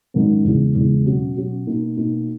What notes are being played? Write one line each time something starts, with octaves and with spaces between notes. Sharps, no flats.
G#2 D#3 F#3 C#4
E2 C#3 G#3
E2 C#3 G#3
B2 F#3 C#4 F#4
B2 F#3 C#4 F#4
B2 A#3 D#4
B2 A#3 D#4